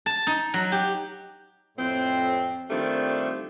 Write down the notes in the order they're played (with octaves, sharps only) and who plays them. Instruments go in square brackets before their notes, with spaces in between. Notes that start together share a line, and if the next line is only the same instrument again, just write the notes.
[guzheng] A5
D#4
F#3
G4
[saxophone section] F2 A2 C4
D#3 F3 G3 A3 C4 D4